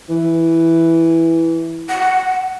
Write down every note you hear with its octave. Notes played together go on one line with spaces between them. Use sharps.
E3
F#5